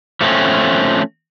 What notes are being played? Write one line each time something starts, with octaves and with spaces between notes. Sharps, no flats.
F3 A3 C4 C#4